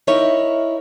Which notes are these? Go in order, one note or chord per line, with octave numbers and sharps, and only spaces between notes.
D#4 E4 A#4 C#5 D#5 E5